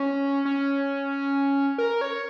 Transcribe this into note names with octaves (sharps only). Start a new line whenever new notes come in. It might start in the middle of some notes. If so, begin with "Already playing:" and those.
Already playing: C#4
C#4
A#4
C#5